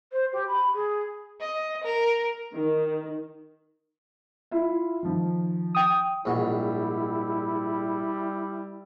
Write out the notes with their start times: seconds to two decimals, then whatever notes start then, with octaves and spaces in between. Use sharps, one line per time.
0.12 C5
0.33 G4
0.48 B5
0.74 G#4
1.41 D#5
1.83 A#4
2.54 D#3
4.51 E4 F4 E5
5.03 D#3 F3
5.75 G5 D#6
6.25 A#1 G#2 G3 E4 F#4